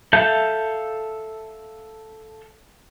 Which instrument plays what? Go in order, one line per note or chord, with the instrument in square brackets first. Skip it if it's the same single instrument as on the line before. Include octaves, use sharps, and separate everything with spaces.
[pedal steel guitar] A4 E5 F5 A5 G6